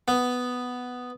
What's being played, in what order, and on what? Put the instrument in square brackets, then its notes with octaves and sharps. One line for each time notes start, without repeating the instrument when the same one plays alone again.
[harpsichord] B3